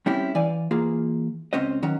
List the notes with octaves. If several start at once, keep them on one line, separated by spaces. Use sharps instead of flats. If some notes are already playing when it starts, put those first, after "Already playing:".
G3 C4 C#4 E4 G4
E3 D5 F5 G#5
E3 A#3 F4 G#4
C#2 C4 C#4 C5 D#5
D#3 F#3 C#4